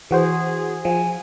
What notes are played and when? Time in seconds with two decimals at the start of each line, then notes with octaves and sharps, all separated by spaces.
0.11 E3 F#4 G#4 C5
0.85 F3 G#5